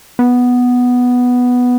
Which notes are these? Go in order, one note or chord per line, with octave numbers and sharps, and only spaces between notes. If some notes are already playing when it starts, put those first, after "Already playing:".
B3